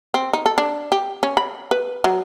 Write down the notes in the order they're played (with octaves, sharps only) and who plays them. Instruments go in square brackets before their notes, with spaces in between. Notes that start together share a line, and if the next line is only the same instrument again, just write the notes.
[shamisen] C4
D#4
A4
D4
G4
C#4
B5
B4
F#3